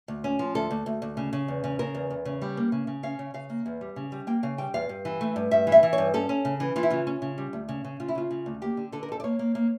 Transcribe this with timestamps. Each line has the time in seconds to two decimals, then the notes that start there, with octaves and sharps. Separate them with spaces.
0.08 D2
0.24 C#4
0.39 F3
0.55 D2 A4
0.71 D2
0.86 D2
1.02 D2
1.17 C#3
1.33 C#3
1.48 E2
1.64 C#3
1.79 C#3 A#4
1.95 E2
2.10 E2
2.25 C#3
2.42 G3
2.57 A#3
2.72 C#3
2.87 C#3
3.03 C#4 F5
3.19 C#3
3.34 C#3 F5
3.50 A#3
3.66 E2
3.81 G3
3.96 C#3
4.12 G3
4.27 A#3 G5
4.43 C#3 F5
4.58 G3 G5
4.74 E2 F5
4.89 G2
5.05 E3
5.21 A3
5.36 G2
5.51 G2 E5
5.67 E3
5.72 E5
5.83 E3
5.93 C#5
5.98 G2
6.14 C#4 A4
6.29 C#4
6.45 C#3
6.60 E3
6.76 E3 F4
6.83 E4
6.90 C#3 F4
7.07 C#4
7.22 C#3
7.38 G3
7.53 D2
7.69 C#3
7.84 C#3
8.00 C#3 F4
8.08 E4
8.15 C#3 F4
8.31 C#3
8.46 D2
8.62 A#3 G4
8.77 D3
8.92 D3 A4
9.03 A#4
9.09 F2 A4
9.20 D5
9.24 A#3 C#5
9.39 A#3
9.55 A#3